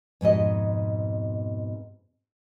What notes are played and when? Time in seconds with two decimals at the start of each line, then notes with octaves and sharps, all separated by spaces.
0.21 F2 G#2 B2 D#5